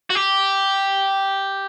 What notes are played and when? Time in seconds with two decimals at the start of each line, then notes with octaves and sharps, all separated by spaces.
0.10 F#4
0.15 G4